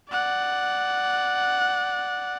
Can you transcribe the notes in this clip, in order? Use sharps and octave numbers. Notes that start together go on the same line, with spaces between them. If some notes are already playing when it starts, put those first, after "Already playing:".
D5 F#5